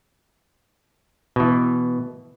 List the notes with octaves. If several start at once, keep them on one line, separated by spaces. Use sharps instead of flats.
B2 E3